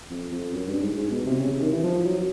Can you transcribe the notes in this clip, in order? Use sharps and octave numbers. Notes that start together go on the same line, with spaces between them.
F2
F2
F#2
G2
G#2
G#2
B2
C3
C#3
C3
D#3
E3
F3
F#3